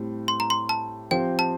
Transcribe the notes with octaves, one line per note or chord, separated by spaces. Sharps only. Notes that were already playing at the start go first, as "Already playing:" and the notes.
Already playing: A2 G3 C4
C6
A#5
C6
A5
F3 C4 G4 C5 G5
A5